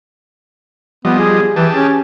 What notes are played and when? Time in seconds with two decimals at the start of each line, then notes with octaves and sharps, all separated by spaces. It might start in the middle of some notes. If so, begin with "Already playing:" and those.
1.05 F3 G3 B3 D#5
1.19 G#4
1.56 E3 G4 G#4 A5
1.74 C#4